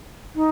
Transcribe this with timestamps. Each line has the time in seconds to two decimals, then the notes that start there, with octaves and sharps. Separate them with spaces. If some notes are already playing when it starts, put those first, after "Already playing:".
0.35 D#4